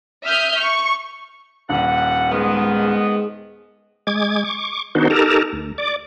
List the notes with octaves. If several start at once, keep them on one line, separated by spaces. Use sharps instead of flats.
E5 D#6 F6 G6
C#6
D#1 G2 A4 F#5
G#2 D#3 G#3 B3
G#3 D6 G#6
C#6 D6
D#3 B3 D4 D#4 F#4 C5
D#4 G4 A4 A#4 A5 A#5
D2
D5 D6